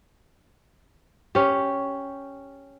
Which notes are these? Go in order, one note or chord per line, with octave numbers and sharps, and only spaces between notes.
C#4 G4